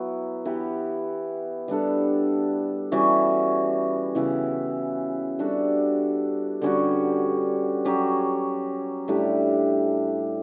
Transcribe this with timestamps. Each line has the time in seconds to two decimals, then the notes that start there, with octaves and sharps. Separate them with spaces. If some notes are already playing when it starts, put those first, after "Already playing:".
Already playing: F#3 B3 E4
0.45 E3 B3 E4 G4
1.68 G3 B3 D4 A4
2.92 E3 G3 C#4 F#4
4.15 C#3 E3 B3 E4
5.39 G3 D4 F#4 A4
6.61 D3 G3 C#4 F#4
7.85 F#3 C#4 G4
9.08 A2 G3 D4 G4